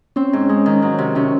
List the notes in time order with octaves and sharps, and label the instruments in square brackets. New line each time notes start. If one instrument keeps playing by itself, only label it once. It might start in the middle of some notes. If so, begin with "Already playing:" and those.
[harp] C4 [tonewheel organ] C#4
[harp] G#2
G#3
D#3
F#3
C3
[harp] C3 [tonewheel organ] C#4